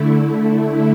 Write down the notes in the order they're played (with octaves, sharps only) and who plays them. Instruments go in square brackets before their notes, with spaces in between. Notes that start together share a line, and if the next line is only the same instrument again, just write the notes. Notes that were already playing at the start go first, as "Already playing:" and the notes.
Already playing: [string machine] D3 A3 E4